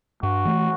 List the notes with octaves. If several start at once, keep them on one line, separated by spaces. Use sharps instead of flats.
G2 F#4
E3 A3